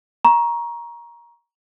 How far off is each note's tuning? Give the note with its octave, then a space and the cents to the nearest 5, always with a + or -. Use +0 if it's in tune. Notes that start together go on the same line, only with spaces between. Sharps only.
A#5 +20 C#6 +0